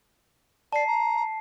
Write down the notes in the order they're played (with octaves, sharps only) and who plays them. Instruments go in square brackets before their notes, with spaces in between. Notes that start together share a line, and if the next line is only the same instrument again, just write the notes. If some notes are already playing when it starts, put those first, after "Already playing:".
[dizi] D5 [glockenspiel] A5 C7
[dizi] A#5